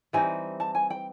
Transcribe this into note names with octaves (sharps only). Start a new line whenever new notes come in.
E3 G3 C4 D#4 G#5
A5
G#5
G5